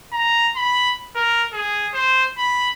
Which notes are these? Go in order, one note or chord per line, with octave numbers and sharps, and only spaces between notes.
A#5
B5
A#4
G#4
C5
B5